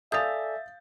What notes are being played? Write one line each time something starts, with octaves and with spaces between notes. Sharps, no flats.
A4 D5 E5 F5 G#5 D#6 G6 A6